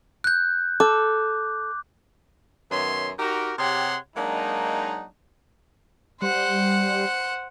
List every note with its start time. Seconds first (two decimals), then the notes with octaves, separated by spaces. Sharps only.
0.24 F#6 G6
0.80 A4 D6
2.71 F#2 D#3 B3 C#5 E5 C6
3.19 D#4 F#4 G4 A#4
3.58 C3 G4 G#4 C#5 F#5 C6
4.17 F#3 G#3 A#3 D4 D#4
6.22 G3 C5 F#5